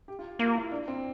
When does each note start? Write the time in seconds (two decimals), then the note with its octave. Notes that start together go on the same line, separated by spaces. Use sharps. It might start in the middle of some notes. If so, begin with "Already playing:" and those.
0.08 G4
0.19 F4
0.39 A#3 F4
0.55 E4
0.72 D4
0.88 C4